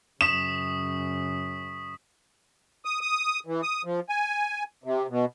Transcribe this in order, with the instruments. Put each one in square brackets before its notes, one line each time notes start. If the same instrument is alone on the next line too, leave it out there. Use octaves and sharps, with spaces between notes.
[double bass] F#2 C#3 [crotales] C#6 D#6 B6 [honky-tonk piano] E7
[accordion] D#6
D#6
E3
D#6
F3
G#5
C3
B2